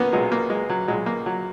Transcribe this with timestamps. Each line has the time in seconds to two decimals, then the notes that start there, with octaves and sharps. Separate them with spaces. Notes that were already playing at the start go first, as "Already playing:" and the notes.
Already playing: A#3 B3 C#4
0.13 B1 A#2 F#3 G#3
0.32 A#3
0.50 G#3
0.70 F#3
0.88 B1 A#2 F#3 G#3
1.06 A#3
1.26 F#3